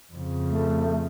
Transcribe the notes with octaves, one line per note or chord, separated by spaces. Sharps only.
F2 C#3
A3